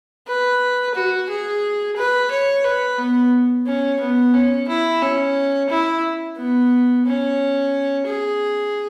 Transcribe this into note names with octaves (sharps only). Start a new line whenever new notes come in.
B4
F#4
G#4
B4
C#5
B4
B3
C#4
B3
C#4
E4
C#4
E4
B3
C#4
G#4